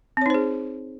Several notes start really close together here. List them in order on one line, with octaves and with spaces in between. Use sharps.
C4 C#5 D#4 C5 G#4